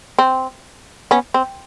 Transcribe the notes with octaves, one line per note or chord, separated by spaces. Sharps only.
C4
B3 C#4
C4